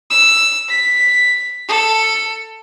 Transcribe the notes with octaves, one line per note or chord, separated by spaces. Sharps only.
E6
B6
A4